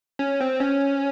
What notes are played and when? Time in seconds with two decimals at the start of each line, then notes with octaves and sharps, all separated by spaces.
0.19 C#4
0.41 C4
0.60 C#4